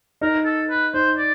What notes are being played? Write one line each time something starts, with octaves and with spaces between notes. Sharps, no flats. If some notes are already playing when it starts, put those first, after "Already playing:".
D#4 A#4
A4
B4
D#4 C5
D5